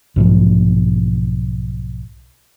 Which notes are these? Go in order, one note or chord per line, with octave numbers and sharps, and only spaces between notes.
B1 G#2 B2 F3